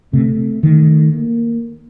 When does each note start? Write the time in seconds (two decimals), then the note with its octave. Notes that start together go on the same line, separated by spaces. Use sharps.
0.13 C3 A3
0.63 D#3 A3
1.14 A#3